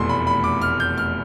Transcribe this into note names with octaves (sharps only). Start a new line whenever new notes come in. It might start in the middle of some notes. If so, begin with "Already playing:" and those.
Already playing: F1 E2 B2 A3 C6
B5
B5
D6
F6
G6
F6